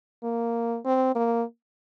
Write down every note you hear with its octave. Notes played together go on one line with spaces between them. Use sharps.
A#3
C4
A#3